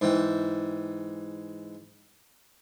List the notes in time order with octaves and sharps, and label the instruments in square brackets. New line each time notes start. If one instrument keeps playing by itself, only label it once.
[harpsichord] G#2 E3 G5